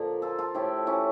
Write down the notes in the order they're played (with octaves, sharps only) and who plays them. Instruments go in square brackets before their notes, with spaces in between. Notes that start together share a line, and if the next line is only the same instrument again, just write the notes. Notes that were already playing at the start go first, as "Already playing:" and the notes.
Already playing: [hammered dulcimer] A#2 D3 F3 A#3
F4 A4
F4 A4
A2 F3 A3 E4 G4
C#4 E4